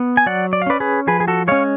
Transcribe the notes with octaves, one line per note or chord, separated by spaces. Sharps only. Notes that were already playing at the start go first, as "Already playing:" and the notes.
Already playing: B3
G#5
F#3 D5 F#5
D5
F5
C#4 B4 D5
G#4 B4
F3 G#4 B4
G#4
F#4 A4
G#3 C#4 C#5 F5